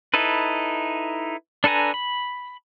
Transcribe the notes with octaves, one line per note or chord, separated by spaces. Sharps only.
D#4 E4 A4 B4
D4 A4 B4 G#5 A#5
B5